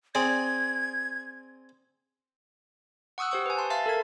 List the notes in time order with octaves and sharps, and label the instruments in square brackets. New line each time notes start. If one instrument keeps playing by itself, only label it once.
[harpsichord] C4 G#4 D5 [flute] G#6
[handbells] F#5 C#6 D#6 E6 F#6
G4 C5 C#6
B4 G#5
A5 C6
E5 F5 A5 C6 A6
A4 A#4 G#6